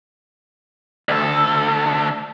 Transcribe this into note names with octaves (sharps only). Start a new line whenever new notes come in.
D2 A4